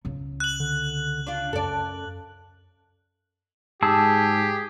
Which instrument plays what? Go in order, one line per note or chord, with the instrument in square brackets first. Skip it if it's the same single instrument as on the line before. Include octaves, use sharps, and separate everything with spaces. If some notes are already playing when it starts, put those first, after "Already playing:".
[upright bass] C#2 C#3
[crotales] F#6 F#7
[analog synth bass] D3
[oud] D4 F4
[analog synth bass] F#2 [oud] A4 D5
[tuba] G#2 [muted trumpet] G4 [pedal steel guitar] G#4 A5 E6